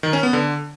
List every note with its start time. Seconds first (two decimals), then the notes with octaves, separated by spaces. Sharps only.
0.03 D#3
0.13 C#4
0.23 B3
0.33 D3